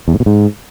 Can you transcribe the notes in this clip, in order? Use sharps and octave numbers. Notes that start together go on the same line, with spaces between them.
E2
G#2
B2
G#2